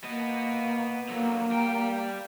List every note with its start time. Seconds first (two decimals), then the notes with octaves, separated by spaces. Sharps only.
0.04 A#3 B3 D#5
1.09 D3 F#3 A#3
1.51 G3 G5